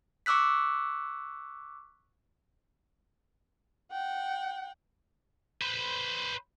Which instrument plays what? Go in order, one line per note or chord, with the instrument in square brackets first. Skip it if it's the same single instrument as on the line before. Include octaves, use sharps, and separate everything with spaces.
[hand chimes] C#6 D6 E6 F#6 B6
[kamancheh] F#5 G5
[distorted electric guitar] B4 C5